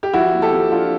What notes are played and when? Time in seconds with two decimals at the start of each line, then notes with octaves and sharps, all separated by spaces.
0.03 G4
0.13 F3 E4 F#4
0.33 A#3
0.42 G4 A4
0.52 F3
0.72 D4 F4